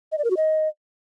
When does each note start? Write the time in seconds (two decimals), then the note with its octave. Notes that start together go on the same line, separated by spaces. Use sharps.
0.12 D#5
0.18 D5
0.24 A#4
0.31 F#4
0.37 D#5